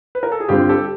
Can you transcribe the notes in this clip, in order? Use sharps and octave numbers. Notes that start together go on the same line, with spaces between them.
B4
A#4
A4
G#4
G2 D3 G3 C4 F4 G4
G4 A4